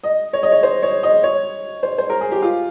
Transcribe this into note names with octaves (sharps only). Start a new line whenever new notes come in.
D#5
C#5
D#5
C#5
C5
C#5
D#5
C#5
C5
C5
A#4
G#4
G4
F4